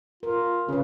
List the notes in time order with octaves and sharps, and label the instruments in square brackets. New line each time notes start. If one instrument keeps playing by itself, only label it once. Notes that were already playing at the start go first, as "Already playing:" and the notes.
[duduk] F4 [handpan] A#4
[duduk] C#3 [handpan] C#4 B4